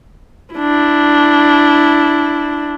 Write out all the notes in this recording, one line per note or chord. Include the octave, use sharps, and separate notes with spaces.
D4 E4